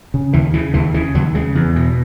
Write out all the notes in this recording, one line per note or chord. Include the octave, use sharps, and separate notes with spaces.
C#3
D#2 E3
C#3 E3
D#2 E3
C#3 E3
D#2 F#3
C#3 G#3
E2
B2